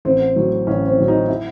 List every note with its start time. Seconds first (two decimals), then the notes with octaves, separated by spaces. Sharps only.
0.05 A1 C4
0.36 A2 F#3
0.67 A1 C#4
0.87 C4
0.98 A2 F#3
1.08 D#4
1.29 E4